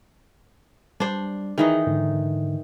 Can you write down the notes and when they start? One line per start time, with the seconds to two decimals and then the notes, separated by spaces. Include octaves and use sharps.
1.00 G3 D4 C5
1.58 D#3 E3 D#4 G#4
1.87 G#2 D3